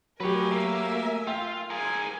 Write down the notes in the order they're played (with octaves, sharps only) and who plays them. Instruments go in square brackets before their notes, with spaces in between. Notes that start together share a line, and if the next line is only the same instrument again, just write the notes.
[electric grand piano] F#3 G4 [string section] A3 A#4 G#5 [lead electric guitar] B4 C#5
[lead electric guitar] A#3 [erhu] E5
[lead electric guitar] F4 [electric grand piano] G5
[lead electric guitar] G#4 A#4 [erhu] G#5